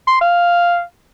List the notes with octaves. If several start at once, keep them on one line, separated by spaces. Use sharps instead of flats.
C6
F5